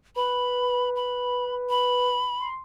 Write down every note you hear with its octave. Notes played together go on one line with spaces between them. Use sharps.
B4 B5
B5
B5
C6